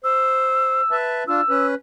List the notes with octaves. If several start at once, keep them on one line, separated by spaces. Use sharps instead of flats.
C5 E6
B4 E5 A5
D4 F4 E6
C#4 B4